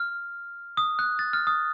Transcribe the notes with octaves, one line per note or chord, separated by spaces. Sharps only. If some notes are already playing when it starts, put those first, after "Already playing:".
Already playing: F6
D#6
F#6
A6
F6
D#6